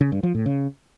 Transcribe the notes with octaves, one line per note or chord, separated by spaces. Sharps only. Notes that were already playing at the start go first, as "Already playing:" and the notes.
C#3
G2
F3
A2
C#3